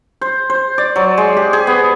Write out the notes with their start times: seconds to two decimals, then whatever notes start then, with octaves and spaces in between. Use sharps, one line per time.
0.21 C5
0.50 C5
0.78 D5
0.96 F#3
1.18 G#3
1.37 G4
1.53 G#4
1.67 B3